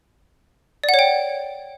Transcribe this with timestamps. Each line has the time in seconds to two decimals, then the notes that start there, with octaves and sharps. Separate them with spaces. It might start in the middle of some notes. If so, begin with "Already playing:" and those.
0.84 D5
0.89 F#5
0.94 C#5
0.99 G5